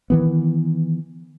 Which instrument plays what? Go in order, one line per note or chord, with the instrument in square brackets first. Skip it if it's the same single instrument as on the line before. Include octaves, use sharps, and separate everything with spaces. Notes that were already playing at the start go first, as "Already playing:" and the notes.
[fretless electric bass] D#3 E3 B3